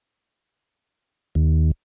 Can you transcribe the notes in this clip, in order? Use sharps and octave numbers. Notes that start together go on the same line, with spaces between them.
D#2